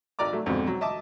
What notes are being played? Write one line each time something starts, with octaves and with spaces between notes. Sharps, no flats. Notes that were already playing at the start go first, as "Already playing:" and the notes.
G#1 D5 A#5 D6
F#3 A3
F2 G#2 B2 D3
F#3
D#5 E5 A5 D6